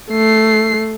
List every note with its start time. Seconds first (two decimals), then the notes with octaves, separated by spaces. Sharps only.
0.11 A3 C7